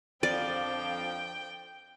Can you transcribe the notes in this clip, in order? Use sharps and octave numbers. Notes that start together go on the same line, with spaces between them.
F2 D3 F3 D5 G5